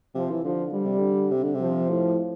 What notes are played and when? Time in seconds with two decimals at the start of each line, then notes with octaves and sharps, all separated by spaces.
0.15 C3 F3
0.30 E3
0.44 D3 F3
0.73 D3 G3
0.85 C3
0.98 D3
1.31 C3
1.43 D3
1.54 C3
1.61 F3
1.90 A2